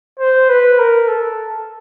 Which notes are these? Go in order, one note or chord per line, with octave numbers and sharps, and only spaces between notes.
C5
B4
A#4
A4